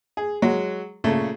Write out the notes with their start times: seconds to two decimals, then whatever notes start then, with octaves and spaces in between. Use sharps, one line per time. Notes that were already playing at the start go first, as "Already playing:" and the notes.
0.17 G#4
0.42 F#3 G#3
1.04 A#2 C#3 A3